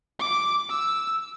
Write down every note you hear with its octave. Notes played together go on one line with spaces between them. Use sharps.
D6
E6